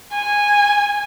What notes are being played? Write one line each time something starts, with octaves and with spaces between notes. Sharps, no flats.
G#5